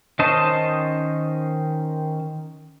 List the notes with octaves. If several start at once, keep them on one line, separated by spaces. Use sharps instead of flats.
D#3 C#4 C5 D#5 A5